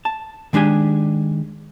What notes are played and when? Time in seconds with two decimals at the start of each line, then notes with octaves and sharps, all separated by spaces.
0.05 A5
0.53 D#3 G#3 D4 G4 G#5